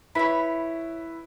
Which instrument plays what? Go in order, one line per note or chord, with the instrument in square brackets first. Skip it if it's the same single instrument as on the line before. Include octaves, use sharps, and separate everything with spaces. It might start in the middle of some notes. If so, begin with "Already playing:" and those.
[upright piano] E4 B4 [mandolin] C#5 B5